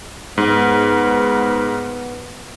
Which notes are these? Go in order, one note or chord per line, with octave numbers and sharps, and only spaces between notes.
G#2 B3